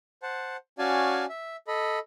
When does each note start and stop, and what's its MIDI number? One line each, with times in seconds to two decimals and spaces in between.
0.23 0.57 72
0.23 0.57 78
0.23 0.57 81
0.79 1.25 61
0.79 1.25 66
0.79 1.25 74
0.79 1.25 77
0.79 1.25 80
0.79 1.25 81
1.29 1.56 76
1.68 1.99 69
1.68 1.99 75
1.68 1.99 83